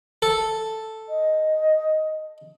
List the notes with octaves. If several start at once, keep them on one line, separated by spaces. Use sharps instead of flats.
A4
D#5